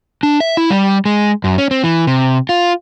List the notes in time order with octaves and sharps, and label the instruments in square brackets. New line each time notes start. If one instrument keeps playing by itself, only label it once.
[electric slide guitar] D4
E5
E4
G3
G#3
F#2
C#4
C4
E3
C3
F4